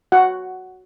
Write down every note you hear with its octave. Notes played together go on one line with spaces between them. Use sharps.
F#4 F#5